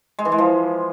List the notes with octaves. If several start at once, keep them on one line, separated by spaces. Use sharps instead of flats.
G#3
E3
G#3
F3